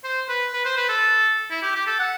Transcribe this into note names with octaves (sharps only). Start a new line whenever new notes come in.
C5
B4
B4
C5
B4
A4
E4
G4
G4
A4
F#5